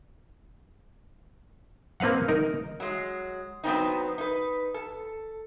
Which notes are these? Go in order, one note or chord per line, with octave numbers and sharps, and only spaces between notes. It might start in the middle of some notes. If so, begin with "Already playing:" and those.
A#3 C4 B4 F5 F#5
D#4 A#4
F#3 G#3
F#3 B3 C4 D#4
D#4 B4
A4